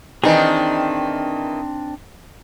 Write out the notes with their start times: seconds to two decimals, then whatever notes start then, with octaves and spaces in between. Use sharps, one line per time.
0.24 D#3 E3 C4 D4 D#4 G#4